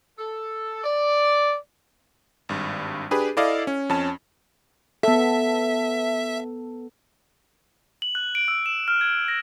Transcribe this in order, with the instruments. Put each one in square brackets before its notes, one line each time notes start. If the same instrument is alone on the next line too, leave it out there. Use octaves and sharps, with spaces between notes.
[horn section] A4
D5
[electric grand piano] G#1 G2
D4 G4 G#4 B4
E4 A4 D5 D#5 F5
C#4
F2 C#4 A5
[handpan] B3 A4 [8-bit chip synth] E5
[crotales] F#7
F#6
D7
E6
E7
F6
G#6
A#6